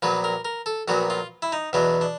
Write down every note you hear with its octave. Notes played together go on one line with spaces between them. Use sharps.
A#1 A#2 F#3 B3 B4
A#4
A#4
A4
A#1 A#2 F#3 B3 F#4
F4
E4
D#4
E2 B2 F#3 B3 D4
D4